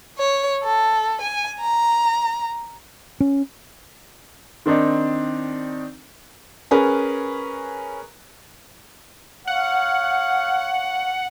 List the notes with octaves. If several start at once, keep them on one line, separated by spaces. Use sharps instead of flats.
C#5
A4
G#5
A#5
C#4
D#3 C4 D4 D#4
C#4 G#4 A#4 B4
C#5 F5 F#5